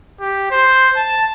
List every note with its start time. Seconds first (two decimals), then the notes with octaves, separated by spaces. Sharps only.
0.20 G4
0.51 C5
0.96 A5